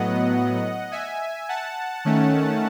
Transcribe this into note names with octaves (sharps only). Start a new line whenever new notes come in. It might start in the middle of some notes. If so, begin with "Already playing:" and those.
Already playing: A2 F#3 B3 D#5 F#5
E5 G#5
F#5 A5
D#3 A3 C#4